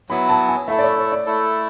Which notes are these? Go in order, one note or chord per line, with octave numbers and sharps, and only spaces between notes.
F#3 B3 E4 B5
A5
G#5
A3 E4 A4 E5
D5
C#5
C#5
D5
A3 E4 A4